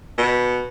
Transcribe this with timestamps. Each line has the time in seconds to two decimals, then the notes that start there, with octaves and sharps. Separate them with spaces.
0.18 B2